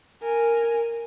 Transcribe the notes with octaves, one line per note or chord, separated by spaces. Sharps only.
A#4 G#5